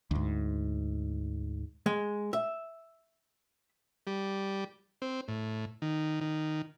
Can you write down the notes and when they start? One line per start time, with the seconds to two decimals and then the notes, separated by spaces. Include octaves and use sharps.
0.11 D2 G#2
1.86 G#3
2.33 E5
4.07 G3
5.02 C4
5.28 A2
5.82 D#3
6.21 D#3